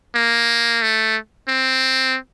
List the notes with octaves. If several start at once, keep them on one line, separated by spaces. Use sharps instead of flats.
A#3
A3
C4